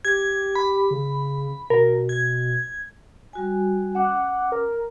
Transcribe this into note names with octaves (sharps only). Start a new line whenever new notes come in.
G4 G#6
B5
C#3
B2 A#4
G#6
G3 F#4 G#5
C#4 F#5 D6
A#4